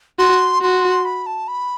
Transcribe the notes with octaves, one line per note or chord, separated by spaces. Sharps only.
F#4 C6
F#4 C6
B5
A5
B5